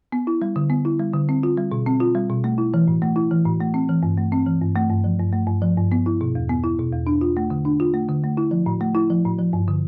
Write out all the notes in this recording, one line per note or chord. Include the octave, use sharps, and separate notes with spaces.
B3
E4
G3
D3
B3
E4
G3
D3
C4
F4
G3
B2
C4
F4
G3
B2
A3
E4
E3
A2
A3
E4
E3
A2
A3
C4
E3
G2
A3
C4
E3
G2
A3
G2
F3
G2
A3
G2
F3
G2
B3
E4
B2
E2
B3
E4
B2
E2
D4
F4
A3
D3
D4
F4
A3
D3
A3
E4
F3
A2
A3
E4
F3
A2
F3
G2
D3